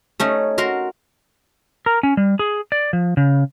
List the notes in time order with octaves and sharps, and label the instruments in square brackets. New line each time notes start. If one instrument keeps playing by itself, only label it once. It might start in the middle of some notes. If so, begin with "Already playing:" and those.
[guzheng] A3 C#4 D#4
F#4 A#4 C6
[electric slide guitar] A#4
C#4
G3
G#4
D5
F3
C#3